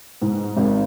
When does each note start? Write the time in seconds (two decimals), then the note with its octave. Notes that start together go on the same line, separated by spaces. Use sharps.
0.22 G#2
0.57 G#1